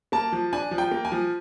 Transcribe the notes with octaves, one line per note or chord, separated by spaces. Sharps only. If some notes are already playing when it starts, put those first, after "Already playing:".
A#3 A5
F3
D4 G#5
F3
G5
A#3
G#5
F3